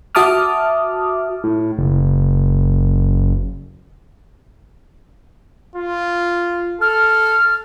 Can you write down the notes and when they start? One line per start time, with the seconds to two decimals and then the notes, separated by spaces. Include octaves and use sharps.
0.15 F#4 E5 A5 D6 D#6 F6
1.44 A2
1.78 F#1
5.76 F4
6.81 A4 F6